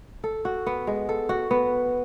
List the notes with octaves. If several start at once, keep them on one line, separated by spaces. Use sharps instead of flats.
A4
F#4
B3
G#3
A4
F#4
B3